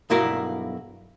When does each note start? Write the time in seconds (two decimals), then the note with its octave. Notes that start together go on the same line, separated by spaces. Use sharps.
0.10 B1 G2 E4 F#4 A#4 F5